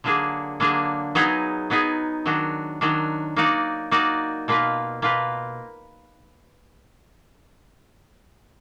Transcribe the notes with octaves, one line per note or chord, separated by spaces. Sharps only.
D3 F#3 A#3 D4 G#4
D3 F#3 A#3 D4 G#4
F#3 B3 D#4 G#4
F#3 B3 D#4 G#4
D#3 F#3 D4 F#4
D#3 F#3 D4 F#4
A#3 D#4 F#4 D5
A#3 D#4 F#4 D5
B2 A#3 F4 B4
B2 A#3 F4 B4